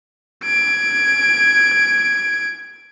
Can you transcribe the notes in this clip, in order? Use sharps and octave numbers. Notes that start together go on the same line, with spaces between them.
G#6 D7